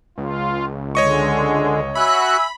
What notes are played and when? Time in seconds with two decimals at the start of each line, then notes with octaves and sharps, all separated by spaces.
0.18 C#2 F4
0.95 D3 G#3 C#5 D#5 C#6
1.95 F#4 E5 G#5 B5 E6 F#6